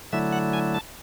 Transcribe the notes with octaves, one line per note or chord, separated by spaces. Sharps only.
D3 F#3 A3 E4 E5
F#5
G#5
A5